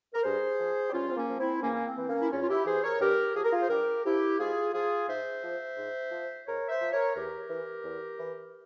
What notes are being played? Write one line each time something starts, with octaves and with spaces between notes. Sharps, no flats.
A#4
G2 G#4 C5
F3
G4
G2 C#4 F4
C4
A#3 C#4
F3
C4 E4
E2 A#3 C#4
C#4
C4
E3
A#3 C#4
E4
E2 C#4 F4
F4
E4 G4
E3 G#4 C5
A#4 C#5
G2 G4 A#4
F3 G#4
A#4
F4 G#4
C5
G2 G4 A#4
F3 E4 G4
G#2 F4 G#4
F3 F4 G#4
G#2 C5 E5
F3
G#2
F3
G#2 A#4 C#5
C5 E5
F3
A#4 C#5
E2 G4 A#4
E3
E2
E3